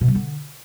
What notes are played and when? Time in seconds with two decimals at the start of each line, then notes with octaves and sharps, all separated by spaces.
0.01 B2
0.08 G3
0.15 D3